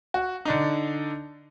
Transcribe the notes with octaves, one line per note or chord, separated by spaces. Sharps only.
F#4
D3 D4 D#4